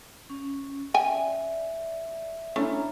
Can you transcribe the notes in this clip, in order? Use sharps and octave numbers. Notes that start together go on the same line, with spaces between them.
C#4
D5 E5 G5 G#5
A3 C#4 D4 E4 C#5 A#5